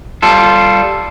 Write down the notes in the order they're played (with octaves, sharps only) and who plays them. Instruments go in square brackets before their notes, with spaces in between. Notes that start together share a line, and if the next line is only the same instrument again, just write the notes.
[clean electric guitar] G3 F4 A4